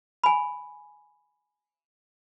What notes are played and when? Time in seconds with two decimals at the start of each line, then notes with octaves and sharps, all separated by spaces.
0.24 G#5 B5